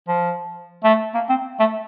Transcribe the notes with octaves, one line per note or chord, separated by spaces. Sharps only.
F3
A3
A#3
C4
A3